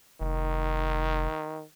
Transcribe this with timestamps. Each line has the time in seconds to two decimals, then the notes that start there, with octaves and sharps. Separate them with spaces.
0.21 F1 D#3